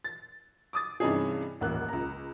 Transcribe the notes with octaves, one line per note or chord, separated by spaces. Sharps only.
A6
D6 D#6 A6
G2 C3 E3 C#4 D#4 G#4
D#1 A1 A#3 F#6
C#2 A#5